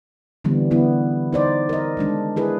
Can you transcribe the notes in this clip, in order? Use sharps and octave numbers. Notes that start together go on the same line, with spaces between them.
D3 E3 G3 B3 C4
D3 B3 E4
D#4 C5 D5
A#4 D#5
D#3 G#3 D4
E4 G#4 B4